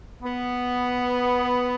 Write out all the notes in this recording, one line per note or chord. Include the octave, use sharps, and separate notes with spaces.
B3